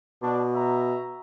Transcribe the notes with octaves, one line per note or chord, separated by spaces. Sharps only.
B2 D4
E5 A#5